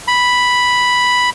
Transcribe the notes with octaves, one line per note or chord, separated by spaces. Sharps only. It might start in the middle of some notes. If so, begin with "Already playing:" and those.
B5